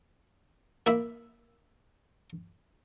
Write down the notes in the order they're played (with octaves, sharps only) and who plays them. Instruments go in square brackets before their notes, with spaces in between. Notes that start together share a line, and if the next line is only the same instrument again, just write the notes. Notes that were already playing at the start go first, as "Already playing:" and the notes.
[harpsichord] A#3 E4 E5